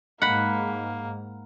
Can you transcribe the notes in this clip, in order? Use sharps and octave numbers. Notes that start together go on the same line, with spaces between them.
G#2 A#3 F#5 B5